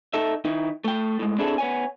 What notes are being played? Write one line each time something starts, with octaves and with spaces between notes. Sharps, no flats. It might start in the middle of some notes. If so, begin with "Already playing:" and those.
D#4 A4 E5
D#3 D#4 E4
A3 G5
A2 G#3
C4 D4 E4 G#4 A4
B3 C#5 G#5